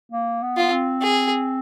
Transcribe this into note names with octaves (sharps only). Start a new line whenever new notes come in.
A#3
B3
F4
B3
C4
G#4